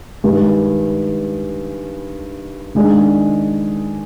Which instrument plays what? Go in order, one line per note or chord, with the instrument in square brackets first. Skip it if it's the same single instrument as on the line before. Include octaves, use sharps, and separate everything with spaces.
[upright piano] G2 D#3 G#3
D#3 G#3 D4 G#4